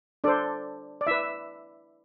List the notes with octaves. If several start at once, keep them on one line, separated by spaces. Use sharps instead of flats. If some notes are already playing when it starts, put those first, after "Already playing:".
D4 A4 C5 D5
D5
E4 B4 E5